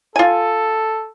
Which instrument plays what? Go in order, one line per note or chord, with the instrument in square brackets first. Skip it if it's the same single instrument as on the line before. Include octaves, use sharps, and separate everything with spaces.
[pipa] F4 G#5 [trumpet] A4